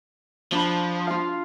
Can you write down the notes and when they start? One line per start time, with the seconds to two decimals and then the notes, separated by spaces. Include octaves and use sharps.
0.52 F3 D4 B5
1.07 F4 F5